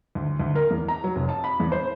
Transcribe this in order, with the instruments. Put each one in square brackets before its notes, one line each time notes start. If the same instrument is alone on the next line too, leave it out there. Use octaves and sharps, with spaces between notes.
[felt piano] D2
D2
A#4
E2
A#5
F#3
F1
A5
B5
E2
C5